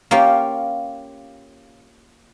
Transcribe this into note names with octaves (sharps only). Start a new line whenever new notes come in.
A#3 C#4 F4 G4